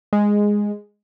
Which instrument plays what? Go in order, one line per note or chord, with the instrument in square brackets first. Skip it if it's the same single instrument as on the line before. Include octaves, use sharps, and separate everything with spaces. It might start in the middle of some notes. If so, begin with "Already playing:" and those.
[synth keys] G#3